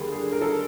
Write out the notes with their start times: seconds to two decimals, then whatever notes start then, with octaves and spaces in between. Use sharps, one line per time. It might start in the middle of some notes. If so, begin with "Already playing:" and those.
Already playing: D#2 D3 G3 A#3 D4 G#4
0.12 G#4
0.32 A#4
0.42 A4